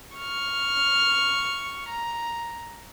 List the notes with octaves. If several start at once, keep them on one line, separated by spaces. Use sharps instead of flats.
C#6 F6
A#5